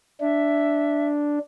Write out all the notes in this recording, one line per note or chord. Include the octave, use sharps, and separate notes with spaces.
D4 E5